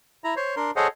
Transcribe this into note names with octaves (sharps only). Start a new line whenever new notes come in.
E4 A#5
C5 C#5
D4 A#4 C6
G#4 A4 C5 C#5 D#5 F#5